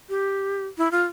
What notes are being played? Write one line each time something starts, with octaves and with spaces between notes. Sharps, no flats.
G4
E4
F4